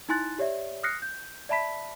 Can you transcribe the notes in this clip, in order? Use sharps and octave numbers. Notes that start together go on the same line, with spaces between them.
D#4 E4 G#5 C6 F#6 A6
G4 C#5 D5 E5
D#6 F6 F#6 A#6 C7 C#7
G6
D5 E5 A5 B5 B6